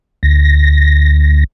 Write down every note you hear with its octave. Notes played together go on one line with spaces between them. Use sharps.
D2 A#6